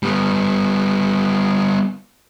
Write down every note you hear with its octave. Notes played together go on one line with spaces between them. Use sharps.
G3 B3